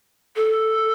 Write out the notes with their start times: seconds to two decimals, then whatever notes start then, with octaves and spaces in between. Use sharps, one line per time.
0.36 A4